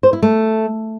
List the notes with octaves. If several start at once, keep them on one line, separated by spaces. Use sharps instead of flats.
C5
E4
A3